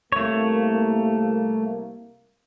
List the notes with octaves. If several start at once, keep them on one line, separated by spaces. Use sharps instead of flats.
C2 A3 A#3 C#5